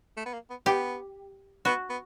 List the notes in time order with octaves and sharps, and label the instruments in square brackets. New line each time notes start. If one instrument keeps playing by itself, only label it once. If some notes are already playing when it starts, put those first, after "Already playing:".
[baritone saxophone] A3
B3
A#3
B3
[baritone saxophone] B3 [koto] G4
[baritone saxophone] B3 [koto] F#4
[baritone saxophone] B3